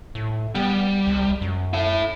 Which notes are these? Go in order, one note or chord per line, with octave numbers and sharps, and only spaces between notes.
A2
G3 B3
C2
F#2
E4 A5